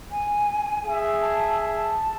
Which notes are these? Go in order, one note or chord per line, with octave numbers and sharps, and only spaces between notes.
G#5
G#4 E5
A5
A5